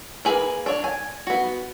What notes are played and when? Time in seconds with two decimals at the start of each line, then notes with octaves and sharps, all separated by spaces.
0.25 A#3 G#4 B4
0.66 D4 C#5
0.84 G#5
1.27 B3 F#4